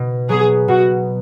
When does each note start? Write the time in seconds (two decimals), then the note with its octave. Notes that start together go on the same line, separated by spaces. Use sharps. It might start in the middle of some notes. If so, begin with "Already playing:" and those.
Already playing: B2
0.29 F#3 B3 G#4
0.68 B2 F#4